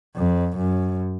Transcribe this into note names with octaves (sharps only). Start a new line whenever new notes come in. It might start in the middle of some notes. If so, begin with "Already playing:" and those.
F2
F#2